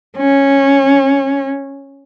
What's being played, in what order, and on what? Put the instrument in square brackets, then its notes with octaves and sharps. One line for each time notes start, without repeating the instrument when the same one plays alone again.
[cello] C#4